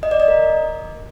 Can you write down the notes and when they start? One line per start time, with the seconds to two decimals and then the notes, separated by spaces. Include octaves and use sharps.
0.03 D#5
0.11 D5
0.20 D#5
0.28 A#4